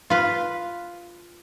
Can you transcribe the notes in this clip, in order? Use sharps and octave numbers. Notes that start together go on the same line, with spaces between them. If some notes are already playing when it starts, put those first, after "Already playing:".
F4 B4